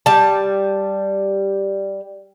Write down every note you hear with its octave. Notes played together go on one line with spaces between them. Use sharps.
G3 A5